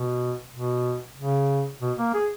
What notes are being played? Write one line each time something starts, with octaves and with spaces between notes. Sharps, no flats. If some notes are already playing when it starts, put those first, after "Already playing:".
Already playing: B2
B2
C#3
B2
A#3
G#4